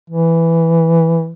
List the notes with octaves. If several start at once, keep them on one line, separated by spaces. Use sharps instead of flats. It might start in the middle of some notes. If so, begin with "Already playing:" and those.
E3